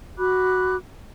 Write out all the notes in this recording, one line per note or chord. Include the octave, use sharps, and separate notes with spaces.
F#4 B5 D6 F#6